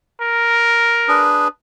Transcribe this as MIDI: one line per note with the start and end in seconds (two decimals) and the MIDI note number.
0.22 1.28 70
1.08 1.48 62
1.08 1.48 68
1.08 1.48 71